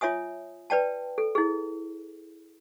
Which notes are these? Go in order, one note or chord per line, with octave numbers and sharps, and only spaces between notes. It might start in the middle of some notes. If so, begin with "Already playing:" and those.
F4 C#5 E5 G#5 D#6
B4 D5 G5 A5
A4
E4 G#4